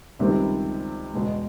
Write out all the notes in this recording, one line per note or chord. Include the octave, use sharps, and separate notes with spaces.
C#2 C3 D#3 G3 C4
E2 B2 G#3